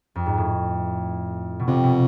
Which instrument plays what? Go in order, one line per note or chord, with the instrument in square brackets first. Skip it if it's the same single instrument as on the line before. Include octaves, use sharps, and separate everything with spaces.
[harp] F2
G#2
A2
B2
[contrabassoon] F2 [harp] C3
[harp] B2